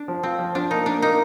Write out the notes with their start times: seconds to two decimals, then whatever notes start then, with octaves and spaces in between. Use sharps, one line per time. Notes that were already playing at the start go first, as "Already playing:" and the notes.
Already playing: D4
0.08 F3
0.23 C4 F4
0.39 F3
0.55 F3 D4
0.70 A#3 D#4
0.86 A#3 D4
1.02 A#3 D#4